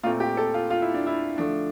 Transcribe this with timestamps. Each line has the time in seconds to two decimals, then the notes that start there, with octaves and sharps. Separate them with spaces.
0.03 A#2 A3 C4 F4
0.20 G4
0.37 A4
0.54 F4
0.70 F4
0.82 E4
0.94 D4
1.07 E4
1.37 D3 F3 A3 D4